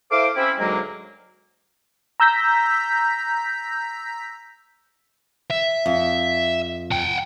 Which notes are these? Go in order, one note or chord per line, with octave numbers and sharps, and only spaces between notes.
E4 A4 C5 F5 D6
C4 C#4 E4
D2 G#2 F#3 G#3 A#3
A#5 E6 G6 A#6 B6
E5
F2
F#5 G5